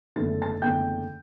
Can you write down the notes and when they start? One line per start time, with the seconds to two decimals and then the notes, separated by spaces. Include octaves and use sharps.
0.16 F#1 E2 D3 A3 A6
0.42 A5 A6
0.62 F#1 E2 D3 A3 G5 G6